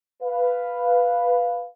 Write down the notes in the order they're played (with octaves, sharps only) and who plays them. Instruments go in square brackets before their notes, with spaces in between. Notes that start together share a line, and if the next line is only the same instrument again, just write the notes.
[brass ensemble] B4 F5